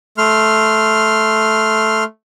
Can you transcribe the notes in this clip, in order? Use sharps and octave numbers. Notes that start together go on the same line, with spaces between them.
A3 C6 F6